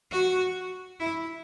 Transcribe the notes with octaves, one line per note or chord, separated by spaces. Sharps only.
F#4
E4